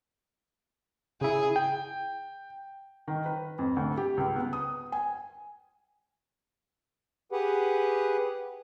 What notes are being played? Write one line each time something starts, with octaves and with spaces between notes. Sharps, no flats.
C#3 E4 G#4
G5
D#3
B4
F2
D2
G4
C#2
B3
D#6
G#5
G4 G#4 B4 F#5